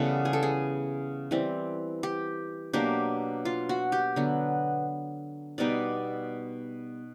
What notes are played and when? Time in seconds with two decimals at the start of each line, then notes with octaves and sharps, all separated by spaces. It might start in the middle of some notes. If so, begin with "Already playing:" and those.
Already playing: C#3 E3 G3 B3 A4
0.25 G#4
0.33 A4
0.43 G#4
1.31 E3 G3 C4
2.03 G4
2.73 B2 F#3 A#3 D4 G4
3.45 F4
3.69 F#4
3.92 G4
4.16 D3 F#3 B3
5.58 B2 G3 B3 D#4 D5